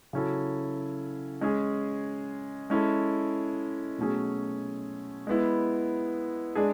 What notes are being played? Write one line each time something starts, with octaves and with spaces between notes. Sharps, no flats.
C#3 F#3 C#4 E4 A4
G#3 C#4 G#4
G#3 C#4 E4 A4
B2 F#3 A3 C#4 G#4
G#3 B3 E4
G#3 D4 G#4